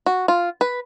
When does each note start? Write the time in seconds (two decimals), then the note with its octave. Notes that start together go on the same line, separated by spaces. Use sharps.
0.06 F#4
0.28 F4
0.61 B4